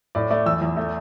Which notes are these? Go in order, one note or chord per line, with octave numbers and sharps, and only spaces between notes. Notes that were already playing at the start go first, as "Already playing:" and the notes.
A2 D5
A3 D5
E2 E6
E2
A3